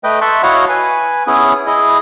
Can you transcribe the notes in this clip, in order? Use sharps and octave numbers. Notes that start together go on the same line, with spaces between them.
A3 B4 D#5 G5
E5 A5 C6 C#6 F#6
E4 F#4 C#5 D#5 F5 F#5
B4 G#5
B3 C#4 E4 G#4
E4 G#4 D#5